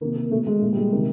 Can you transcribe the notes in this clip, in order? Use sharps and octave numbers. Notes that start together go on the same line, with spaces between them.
C3 D#3 A#3
A#3
B2 A3
G#3
A#2 A3
G3
G#3
C3 D#3 A#3